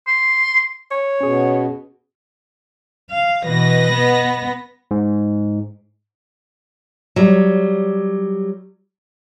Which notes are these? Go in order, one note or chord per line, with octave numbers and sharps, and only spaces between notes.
C6
C#5
B2 C#4 G#4
F5
B2 E3 B4 D#5 A#6
B3
G#2
F#3 G3